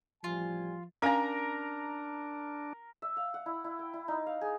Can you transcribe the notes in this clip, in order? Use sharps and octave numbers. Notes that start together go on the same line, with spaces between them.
A1 F3 G3 F4 G#5
C#4 D4 A#4 F5 G#5 A#5
E5
F5
F#5
E4
E4
G5
E4
D#4
F5
G#4